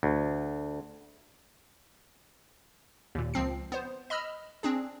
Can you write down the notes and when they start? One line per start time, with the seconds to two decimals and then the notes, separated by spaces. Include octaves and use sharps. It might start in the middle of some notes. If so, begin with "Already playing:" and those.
0.03 D2
3.15 D#2 A#2
3.34 C#2 F3 C4 C7
3.72 B3 C5
4.10 D#5 B5 E6 F6
4.63 C4 D4 G#4